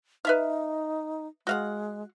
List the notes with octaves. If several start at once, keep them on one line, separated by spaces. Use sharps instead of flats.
D#4 B4 E5 F5
G#3 F#4 F5 F#5